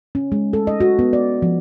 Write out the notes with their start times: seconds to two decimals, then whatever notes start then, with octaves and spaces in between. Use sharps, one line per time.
0.15 C#4
0.32 G#3
0.53 A4
0.67 D#5
0.80 F#4
0.99 B3
1.13 D5
1.42 F3